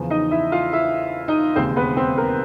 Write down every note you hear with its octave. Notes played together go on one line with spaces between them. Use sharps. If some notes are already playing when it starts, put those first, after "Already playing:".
Already playing: E2 C#3 F3
D#4 D#5
E4 E5
F4 F5
E4 E5
D#4 D#5
E1 D#2 C#3 C4 C5
B3 B4
C4 C5
A#3 A#4